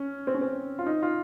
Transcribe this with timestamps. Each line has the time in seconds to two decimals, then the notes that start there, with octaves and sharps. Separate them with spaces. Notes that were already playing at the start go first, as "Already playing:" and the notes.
Already playing: C#4
0.27 C4
0.35 C#4
0.41 C4
0.79 F4
0.86 D#4
1.03 F4